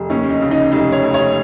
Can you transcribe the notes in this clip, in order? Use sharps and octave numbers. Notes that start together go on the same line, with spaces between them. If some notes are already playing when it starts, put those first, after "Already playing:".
Already playing: F1
D#2 C#4
D#4
C#3
D#4
F1 D#4
C#5
F1
C#5